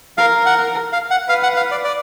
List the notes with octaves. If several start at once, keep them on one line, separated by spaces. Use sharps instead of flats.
A#4 F5
F#5
F5
F#5
B4 F5
F#5
F5
D5
D5